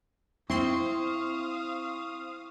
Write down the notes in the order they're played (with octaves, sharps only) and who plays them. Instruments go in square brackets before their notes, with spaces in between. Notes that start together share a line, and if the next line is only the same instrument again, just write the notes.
[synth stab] C4 C6 [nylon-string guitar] E4 [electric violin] F5 D#6 [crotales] C#6